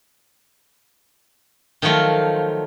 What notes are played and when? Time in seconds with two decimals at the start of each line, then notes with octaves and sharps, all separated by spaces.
1.82 D#3 F3 F#3 A3 F4